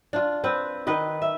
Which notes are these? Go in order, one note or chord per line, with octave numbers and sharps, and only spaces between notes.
D4 F4
C4 B4
D#3 B4 D#5
E5